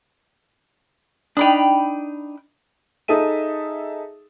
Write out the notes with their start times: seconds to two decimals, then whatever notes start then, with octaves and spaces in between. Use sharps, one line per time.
1.37 D4 D#4 G5 B5 D#6
3.08 D#4 G#4 A4 E5 D#7